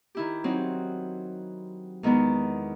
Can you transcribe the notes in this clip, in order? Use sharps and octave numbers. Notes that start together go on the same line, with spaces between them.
D#3 E4 G4
F#3 C4 D#4
E2 D#3 G#3 B3